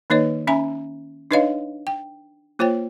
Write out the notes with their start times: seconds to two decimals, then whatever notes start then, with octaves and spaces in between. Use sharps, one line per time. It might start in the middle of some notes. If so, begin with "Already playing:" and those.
0.10 D#3 A#3 D#4 B4 C#5 D#5
0.47 C#4 E5 G#5 A#5 B5
1.31 D4 D#4 B4 C#5 D#5 F5
1.87 G5
2.59 A#3 F4 C5 C#5 G5